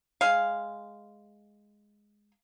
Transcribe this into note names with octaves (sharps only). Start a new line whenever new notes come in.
G#3 F5